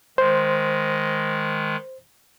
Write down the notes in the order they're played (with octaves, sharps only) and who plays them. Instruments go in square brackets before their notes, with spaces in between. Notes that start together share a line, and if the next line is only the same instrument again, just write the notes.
[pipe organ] D#3 G#3 [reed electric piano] C5